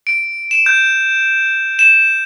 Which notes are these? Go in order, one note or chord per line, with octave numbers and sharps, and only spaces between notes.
D7
E7
G6
E7